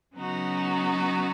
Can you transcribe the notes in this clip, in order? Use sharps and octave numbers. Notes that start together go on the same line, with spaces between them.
C#3 F#3 B3 D#4 F#4